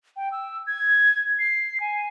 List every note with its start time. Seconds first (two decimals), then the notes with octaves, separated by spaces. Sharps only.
0.16 G5
0.32 E6
0.67 G#6
1.39 C7
1.80 G#5